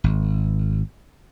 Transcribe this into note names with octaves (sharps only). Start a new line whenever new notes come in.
G#1